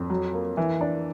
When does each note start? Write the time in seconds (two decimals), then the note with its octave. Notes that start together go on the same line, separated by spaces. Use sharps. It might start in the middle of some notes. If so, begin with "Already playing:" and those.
Already playing: F2
0.10 F#3
0.33 A#3
0.57 E3
0.81 D4